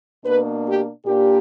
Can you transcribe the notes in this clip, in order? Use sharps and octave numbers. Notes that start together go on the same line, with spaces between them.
B2 A#3 D4 B4
G4
A#2 A#3 D4 G4